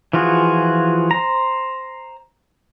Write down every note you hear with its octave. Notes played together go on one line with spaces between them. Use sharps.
E3 F3 F4 F#4 G#4
C5 A#5